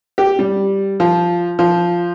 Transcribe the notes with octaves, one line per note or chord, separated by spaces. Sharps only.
G4
G3
F3
F3